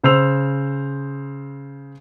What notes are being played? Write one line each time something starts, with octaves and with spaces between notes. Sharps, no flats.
C#3 C5 E6 F7